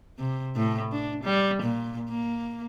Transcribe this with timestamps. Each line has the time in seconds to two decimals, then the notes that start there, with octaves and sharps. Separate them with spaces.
0.18 C3
0.56 A2
0.92 D4
1.24 G3
1.62 A#2
2.09 A#3